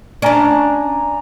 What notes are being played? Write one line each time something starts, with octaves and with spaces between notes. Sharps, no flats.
C#4 D4 D5 G#5 A#5